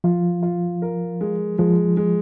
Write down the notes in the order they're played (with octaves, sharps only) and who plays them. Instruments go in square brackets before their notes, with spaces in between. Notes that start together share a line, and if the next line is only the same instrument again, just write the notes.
[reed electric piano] F3 [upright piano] F4
[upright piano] F4
A#4
G#3
[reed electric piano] F3 [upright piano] G#3
[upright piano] G#3